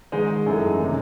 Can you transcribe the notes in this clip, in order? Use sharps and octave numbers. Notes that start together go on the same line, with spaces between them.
G#2 D#3 G#3 D#4 D#5
F#2 E3 A3
C3 D#3